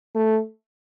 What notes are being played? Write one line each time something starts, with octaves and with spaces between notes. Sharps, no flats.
A3